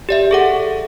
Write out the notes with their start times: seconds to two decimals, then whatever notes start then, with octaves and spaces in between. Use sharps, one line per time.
0.09 G4 D5 E5
0.31 G#4 A4 F#5